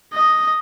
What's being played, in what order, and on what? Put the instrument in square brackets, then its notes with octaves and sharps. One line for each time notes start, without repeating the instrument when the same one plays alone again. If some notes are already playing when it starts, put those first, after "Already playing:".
[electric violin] D#5